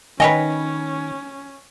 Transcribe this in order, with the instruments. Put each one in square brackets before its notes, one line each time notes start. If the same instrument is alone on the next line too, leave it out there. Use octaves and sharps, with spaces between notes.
[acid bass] D#3 [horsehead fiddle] C#4 [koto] B4 C#5 D#5 [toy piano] E5 G5 G#5